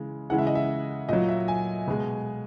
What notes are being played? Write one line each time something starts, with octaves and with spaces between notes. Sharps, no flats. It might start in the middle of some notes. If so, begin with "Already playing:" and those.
Already playing: C#3 E3 G#3
C#3 E3 G#3 F#5
E5
D#5
E5
A#2 F#3 D#5
E5
G#5
B2 G#3